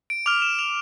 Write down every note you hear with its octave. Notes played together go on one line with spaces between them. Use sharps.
D7
D6 F6 F7
E7
F7